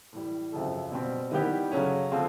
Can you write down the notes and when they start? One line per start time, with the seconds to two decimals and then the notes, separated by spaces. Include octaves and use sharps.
0.13 A2 E3 G3
0.52 G#1 F#2 C#3 F3 A3
0.92 B2 G3 C4
1.32 D#3 G3 B3 E4 G4
1.72 C#3 F#3 A3 C#4
2.12 D3 F3 G#3 C4 F4